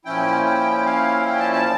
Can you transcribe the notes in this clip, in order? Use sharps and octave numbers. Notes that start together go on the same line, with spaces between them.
A#2 F3 C#4 E4 G5
G5
F5
G5
A5
A5